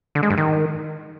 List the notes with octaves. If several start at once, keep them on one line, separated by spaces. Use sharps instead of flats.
D3
G#3
G2
D#3